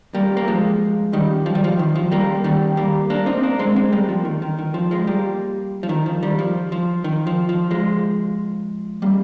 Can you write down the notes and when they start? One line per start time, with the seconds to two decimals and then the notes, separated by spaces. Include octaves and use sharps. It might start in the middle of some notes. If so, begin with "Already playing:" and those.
0.15 G3 A#3
0.37 A#3
0.48 F3 G#3
1.13 D#3 G3
1.46 F3
1.55 G3
1.64 F3
1.79 D#3
1.95 F3
2.11 G3 A#3
2.44 D#3 G3
2.77 G3 A#3
3.10 A#3 D4
3.26 C4 D#4
3.43 A#3 D4
3.59 G#3 C4
3.76 G#3 C4
3.92 G3 A#3
4.09 F3
4.25 D#3
4.42 D#3
4.59 D#3
4.74 F3
4.91 F3 G#3
5.07 G3 A#3
5.83 F3
5.89 D#3
6.06 F3
6.23 D#3 G3
6.39 F3
6.72 F3
7.04 D#3
7.27 F3
7.49 F3
7.71 F3 G#3
9.02 G3 A#3